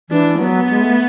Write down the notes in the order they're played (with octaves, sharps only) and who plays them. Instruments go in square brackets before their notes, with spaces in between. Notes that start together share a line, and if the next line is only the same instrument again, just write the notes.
[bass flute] E3 [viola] D4
[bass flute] F#3 [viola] B3
[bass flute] G#3
A3